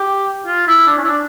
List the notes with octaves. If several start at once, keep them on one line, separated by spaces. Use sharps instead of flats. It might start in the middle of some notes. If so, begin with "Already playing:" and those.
Already playing: G4
F4
E4
D4
C#4
E4
D4